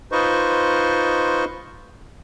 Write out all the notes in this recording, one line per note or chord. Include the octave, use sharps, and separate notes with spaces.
D#4 F4 B4 C5 D#5 C#6